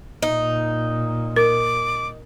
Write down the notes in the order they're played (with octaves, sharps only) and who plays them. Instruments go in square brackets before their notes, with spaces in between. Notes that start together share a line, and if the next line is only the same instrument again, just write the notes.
[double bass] A#2 [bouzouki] D#4
[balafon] A#4 [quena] D6